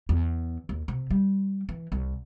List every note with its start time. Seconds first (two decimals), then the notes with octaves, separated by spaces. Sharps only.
0.09 E2
0.69 D#2
0.88 C3
1.11 G3
1.69 E3
1.92 C2